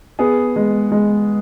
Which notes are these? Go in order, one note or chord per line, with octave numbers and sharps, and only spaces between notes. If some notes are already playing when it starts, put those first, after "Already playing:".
B3 G#4
G#3
G#3